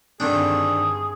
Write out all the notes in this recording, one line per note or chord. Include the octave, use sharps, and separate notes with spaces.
G2 D3 D#3 C4 D4 G#4